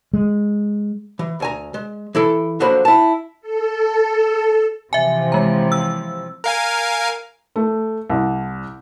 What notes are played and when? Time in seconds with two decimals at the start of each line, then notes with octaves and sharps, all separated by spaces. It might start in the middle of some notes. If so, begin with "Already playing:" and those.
0.13 G#3
1.19 E3
1.40 D2 G#5 A#5
1.74 G#3
2.15 E3 E4 A4
2.60 D3 F3 F#3 A#3 C5 B5
2.85 E4 A5
3.41 A4
4.93 C3 E3 F3 E5 G#5
5.32 G#3 A#5
5.72 E6
6.44 A#4 F5 G#5
7.56 A3
8.10 C2